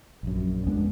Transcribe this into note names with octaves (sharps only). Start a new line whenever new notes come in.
A#1 F#2
F2 G#3 B3 D4